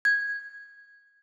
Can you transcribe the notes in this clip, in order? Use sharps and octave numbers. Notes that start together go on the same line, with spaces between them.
G#6